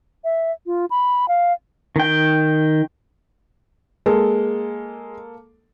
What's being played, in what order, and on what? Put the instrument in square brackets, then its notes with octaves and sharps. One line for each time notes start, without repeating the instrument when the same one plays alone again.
[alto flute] E5
F4
B5
F5
[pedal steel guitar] D#3 G5
[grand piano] G#3 [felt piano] A#3 A4